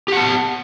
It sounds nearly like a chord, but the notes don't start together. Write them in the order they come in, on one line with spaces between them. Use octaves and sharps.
G4 F#5 A5